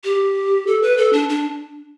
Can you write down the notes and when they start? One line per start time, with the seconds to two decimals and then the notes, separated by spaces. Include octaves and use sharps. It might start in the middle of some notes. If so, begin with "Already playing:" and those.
0.04 G4
0.67 A4
0.82 B4
0.98 A4
1.13 D4
1.29 D4